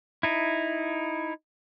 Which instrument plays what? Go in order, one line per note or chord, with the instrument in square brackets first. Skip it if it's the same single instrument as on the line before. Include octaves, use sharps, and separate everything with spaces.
[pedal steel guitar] D#4 E4